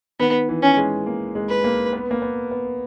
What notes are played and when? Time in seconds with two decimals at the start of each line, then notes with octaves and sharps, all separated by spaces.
0.20 D#3 B3
0.49 E3
0.62 C#4
0.77 G#3
1.06 A#3
1.35 G#3
1.49 B4
1.64 A#3
1.93 B3
2.11 A#3
2.22 B3
2.51 B3